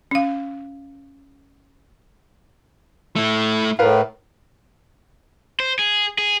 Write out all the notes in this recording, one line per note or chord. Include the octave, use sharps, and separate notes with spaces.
C#4 F5
A3 E4
A2 A#4 B4 F5
C5
G#4
G#4